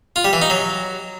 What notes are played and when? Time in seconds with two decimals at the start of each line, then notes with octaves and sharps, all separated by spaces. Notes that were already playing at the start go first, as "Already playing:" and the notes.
0.16 F4
0.24 G3
0.33 E3
0.42 D#4
0.50 F#3